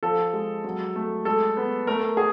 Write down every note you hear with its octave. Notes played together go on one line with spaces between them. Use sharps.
F3 A4
G#3
F#3
A3
G#3 A4
B3
A3 A#4
G#4